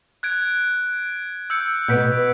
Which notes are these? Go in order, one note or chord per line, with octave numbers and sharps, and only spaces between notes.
F#6 G#6 D7
E6 G6 C#7
B2 B3 G6 B6 D7